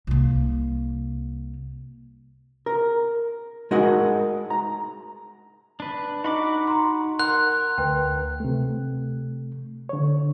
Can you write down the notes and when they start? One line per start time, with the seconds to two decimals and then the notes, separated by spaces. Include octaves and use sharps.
0.07 C2 A#3
2.66 A#4
3.71 G#3 D#4 F#4 A#4 F#5
4.50 A#5
5.80 D4 B4
6.24 D#4 F#4 B5 D6
6.67 A#5 C6
7.19 A#4 F#5 C6 F#6
7.78 D2 B4 G5
8.40 C3 A3
9.89 D3 C#5